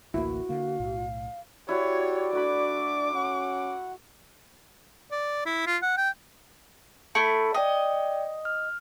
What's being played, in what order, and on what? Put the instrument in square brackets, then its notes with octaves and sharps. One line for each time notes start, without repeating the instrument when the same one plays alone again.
[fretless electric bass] A1 D2 A#3 [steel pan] E4 [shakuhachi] F#4
[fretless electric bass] D3 A#3 [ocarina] F5
[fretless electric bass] B1 A2
[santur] E4 F#4 [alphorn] G4 [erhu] C#5 [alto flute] D5
[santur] A3 F#4 B5 [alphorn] D4 [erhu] D6
[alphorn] C#4 [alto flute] F#5
[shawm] D5
E4
F4
F#5
G5
[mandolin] A3 E4 [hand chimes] A5
[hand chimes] D5 G5 D#6 [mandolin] D#5
[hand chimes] F6